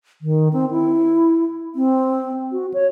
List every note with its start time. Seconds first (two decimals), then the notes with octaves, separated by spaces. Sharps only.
0.22 D#3
0.53 C4
0.71 E4
1.75 C4
2.52 F#4
2.74 C#5